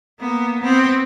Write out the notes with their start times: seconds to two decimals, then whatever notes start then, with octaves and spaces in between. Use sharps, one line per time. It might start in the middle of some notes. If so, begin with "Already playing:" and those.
0.20 A#3 B3
0.62 B3 C4